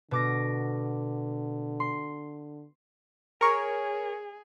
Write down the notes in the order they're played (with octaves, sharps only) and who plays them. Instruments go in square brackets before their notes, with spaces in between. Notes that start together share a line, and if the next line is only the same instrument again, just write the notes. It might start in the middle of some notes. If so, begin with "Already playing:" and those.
[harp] B2 D6 A#6 [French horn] D3
[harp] C6
[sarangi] G#4 [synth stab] A#4 C#5